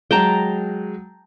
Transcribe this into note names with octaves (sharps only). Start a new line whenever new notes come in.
F#3 G#3 G5 A5 A#5